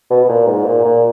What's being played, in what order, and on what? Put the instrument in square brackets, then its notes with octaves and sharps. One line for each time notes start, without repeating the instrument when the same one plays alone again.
[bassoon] B2
B2
A#2
G#2
A#2
A#2